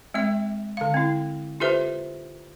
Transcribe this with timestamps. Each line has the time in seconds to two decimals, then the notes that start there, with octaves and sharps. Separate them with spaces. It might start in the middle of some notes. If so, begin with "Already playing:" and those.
0.14 G#3 C4 E5
0.77 D3 F5
0.94 C4 E4
1.60 F4 G4 A4 B4 C5 E5